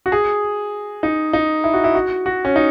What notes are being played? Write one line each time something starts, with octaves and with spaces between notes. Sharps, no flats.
F#4
G#4
D#4
D#4
E4
F#4
E4
F#4
F#4
C#4
D#4